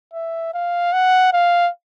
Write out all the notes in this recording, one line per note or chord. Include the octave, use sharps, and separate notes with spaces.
E5
F5
F#5
F5